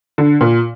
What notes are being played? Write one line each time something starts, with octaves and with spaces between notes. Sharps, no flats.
D3
A#2